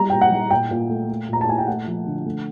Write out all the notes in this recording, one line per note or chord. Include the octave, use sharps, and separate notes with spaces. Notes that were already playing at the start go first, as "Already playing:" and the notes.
Already playing: G3 A#5
A#2 G5
F#5
G3
A#2 G5
A#2
A3
A3
A#2 A#5
A5
A#2 G#5
G5
A3 F#5
F3
D3
A3